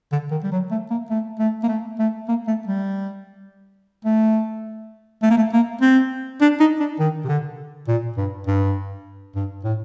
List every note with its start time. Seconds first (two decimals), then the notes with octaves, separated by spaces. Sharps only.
0.12 D3
0.31 D#3
0.43 G3
0.51 F#3
0.71 A3
0.90 A#3
1.10 A3
1.39 A3
1.63 A#3
1.68 A3
1.99 A3
2.28 A#3
2.47 A3
2.67 G3
4.05 A3
5.22 A3
5.30 A#3
5.37 A3
5.52 A#3
5.81 C4
6.41 D4
6.60 D#4
6.80 D4
6.99 D#3
7.24 C3
7.28 D3
7.87 A#2
8.17 G2
8.47 G2
9.35 G2
9.64 A2